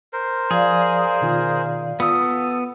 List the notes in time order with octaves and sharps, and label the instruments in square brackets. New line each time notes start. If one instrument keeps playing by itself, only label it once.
[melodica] A#4 C5
[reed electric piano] F3 [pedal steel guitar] G#4 [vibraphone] D5 F5
[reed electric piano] B2 D#3 F4
[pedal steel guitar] B3 D#6 [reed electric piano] F4 [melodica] A4